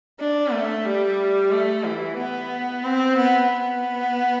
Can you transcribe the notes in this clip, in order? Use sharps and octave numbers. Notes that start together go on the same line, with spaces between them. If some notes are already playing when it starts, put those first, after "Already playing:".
D4
A3
G3
A3
E3
B3
C4
B3
B3